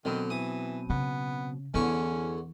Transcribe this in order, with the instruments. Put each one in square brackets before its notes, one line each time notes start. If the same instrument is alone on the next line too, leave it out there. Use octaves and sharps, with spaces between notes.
[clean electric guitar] B2 F#3 C4 [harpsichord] D3 [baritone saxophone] D#3
[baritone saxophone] E3 [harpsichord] D#6
[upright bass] C#3 [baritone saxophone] B3
[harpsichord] E2 D3 C#6 [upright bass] E3 [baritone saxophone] C#4